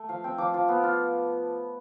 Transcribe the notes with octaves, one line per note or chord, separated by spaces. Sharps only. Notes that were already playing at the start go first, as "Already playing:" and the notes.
Already playing: A3
F3 F5
C4 G5
F3 D6
F3
B3
F4